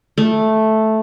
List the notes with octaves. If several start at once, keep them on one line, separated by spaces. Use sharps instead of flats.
A3